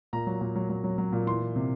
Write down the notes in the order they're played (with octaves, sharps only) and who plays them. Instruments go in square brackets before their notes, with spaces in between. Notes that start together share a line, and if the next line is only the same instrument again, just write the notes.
[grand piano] A#2 A#5
F#3
A#2
F#3
F#3
F#3
F#3
A#2
E3 C6
E3
C3